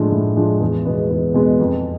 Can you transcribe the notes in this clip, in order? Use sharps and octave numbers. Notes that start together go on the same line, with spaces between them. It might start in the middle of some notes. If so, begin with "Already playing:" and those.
Already playing: A2 F3 G#3 D4
A2
F3 G#3 D4
E2
B2 G#3 B3
E2
B2 G#3 B3
F2